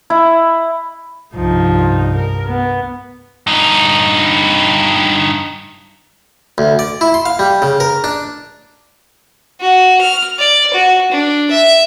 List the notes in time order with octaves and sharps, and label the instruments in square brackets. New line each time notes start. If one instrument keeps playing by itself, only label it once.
[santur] E4
[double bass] C2 G2 [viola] F3 D#4
[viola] A#4
B3
[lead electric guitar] G2 D#4
[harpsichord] D2
D5
E4
C6
F5
G3
C#3
A#4
D4
[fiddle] F#4
F6
D5
F#4
D4
E5